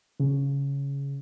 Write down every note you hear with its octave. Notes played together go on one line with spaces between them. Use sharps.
C#3